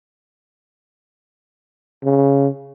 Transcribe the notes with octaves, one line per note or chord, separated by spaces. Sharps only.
C#3